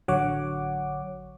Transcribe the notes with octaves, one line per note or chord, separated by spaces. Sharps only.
A1 D3 F#3 C#5 F#5 D6